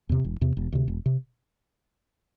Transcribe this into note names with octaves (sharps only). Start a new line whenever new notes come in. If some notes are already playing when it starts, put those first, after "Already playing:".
E2 C3
E1
E2 C3
E1
D2 C3
E1
C3